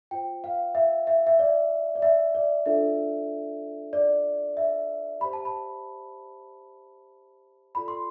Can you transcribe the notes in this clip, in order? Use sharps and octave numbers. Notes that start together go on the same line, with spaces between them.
F4 C5 G5
F5
E5
E5
E5
D5
D5
E5
D5
D4 F4 A4 D5 E5
D5
E5
G4 C5 B5
A5
B5
F4 A4 D5 B5
C6